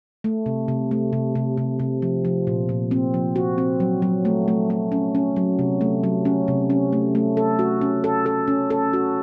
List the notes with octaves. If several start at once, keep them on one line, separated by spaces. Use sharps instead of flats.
A3
C3
C3
A3
C3
C3
C3
C3
F3
F3
A#2
A#2
C4
F3
F#4
C4
F#3
F#3
A3
A3
A3
C#4
C#4
F#3
C3
A3
F#3
C#4
C3
C#4
A3
A3
A4
F#4
C#4
A4
A4
C#4
A4
F#4